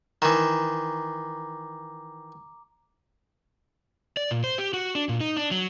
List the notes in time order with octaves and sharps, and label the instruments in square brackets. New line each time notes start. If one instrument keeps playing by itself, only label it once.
[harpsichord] D#3 E3 [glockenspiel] A#5 D6
[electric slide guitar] D5
A#2
C5
G4
F#4
D4
A#2
D#4
D4
F#3